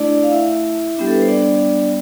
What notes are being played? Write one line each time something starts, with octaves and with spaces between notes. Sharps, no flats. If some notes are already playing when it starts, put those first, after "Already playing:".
Already playing: A3 D4 E4 D5
F5
E4 E5
G3 B3 D4 G4
A4
B4
C5
D4 D5